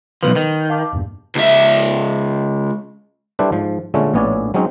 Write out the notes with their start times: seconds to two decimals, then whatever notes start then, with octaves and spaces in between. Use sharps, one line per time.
0.23 B1 E2 F3 B4
0.36 D#3
0.69 F5 A5 D6
0.92 E2 G2 A#2
1.35 C#2 E5
3.39 G3 D4 E4 A4 B4 C5
3.52 G#2 F3
3.94 A#2 D3 G#3 A3 C#4
4.14 A#1 A2 B3 C#4 D5 G#5
4.54 F#3 G#3 C4 C#4 D#4